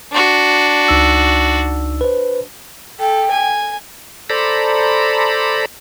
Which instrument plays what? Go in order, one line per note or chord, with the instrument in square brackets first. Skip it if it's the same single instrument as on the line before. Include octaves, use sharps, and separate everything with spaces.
[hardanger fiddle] D4 F#4
[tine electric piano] C#2 D#4 E6
B4 C5
[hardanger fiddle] A4 [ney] G5
[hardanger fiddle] G#5
[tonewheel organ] A4 C5 D5 A#5 B5